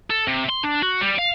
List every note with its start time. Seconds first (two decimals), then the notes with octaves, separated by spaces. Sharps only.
0.10 A4
0.28 C3
0.50 C6
0.64 D4
0.82 F#4
1.01 G3
1.18 F5